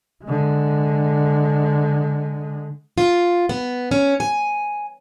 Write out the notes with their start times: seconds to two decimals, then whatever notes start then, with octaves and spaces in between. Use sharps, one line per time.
0.24 D3 G#3
2.98 F4
3.49 B3
3.91 C#4
4.20 G#5